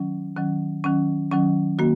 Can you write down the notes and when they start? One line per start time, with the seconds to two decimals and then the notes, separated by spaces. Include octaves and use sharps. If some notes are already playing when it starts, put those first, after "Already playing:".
Already playing: D#3 F#3 C#4
0.37 D#3 F#3 C#4
0.84 D#3 F#3 C#4
1.31 D#3 F#3 C#4
1.78 D#3 A#3 F#4